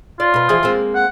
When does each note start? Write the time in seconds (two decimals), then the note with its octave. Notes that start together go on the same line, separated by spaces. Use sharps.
0.20 F4 D5
0.34 B2 B4
0.49 E3 F3 G#4
0.63 G#3 A#3 C4
0.95 F#5